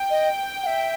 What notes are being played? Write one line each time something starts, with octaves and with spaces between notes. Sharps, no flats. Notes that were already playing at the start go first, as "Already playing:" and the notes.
Already playing: G5
D#5
F#5
E5